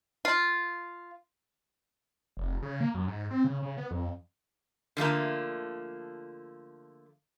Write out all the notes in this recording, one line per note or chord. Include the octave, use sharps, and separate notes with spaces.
F4
F1
C#3
A#3
F#2
G#2
C4
C#3
C#3
B3
F2
D3 F3 A3 A#3